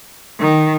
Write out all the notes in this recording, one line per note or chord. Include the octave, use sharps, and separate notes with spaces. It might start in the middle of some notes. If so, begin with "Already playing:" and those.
D#3